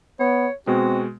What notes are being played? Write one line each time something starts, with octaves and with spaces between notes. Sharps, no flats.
B3 C#5
B2 G#3 C4 F#4